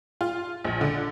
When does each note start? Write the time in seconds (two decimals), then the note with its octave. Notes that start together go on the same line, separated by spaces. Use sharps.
0.21 F4
0.64 A#1
0.81 D3